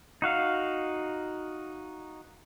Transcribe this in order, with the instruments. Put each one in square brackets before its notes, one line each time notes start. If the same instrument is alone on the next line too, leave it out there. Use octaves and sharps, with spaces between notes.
[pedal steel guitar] D#4 F#4 F5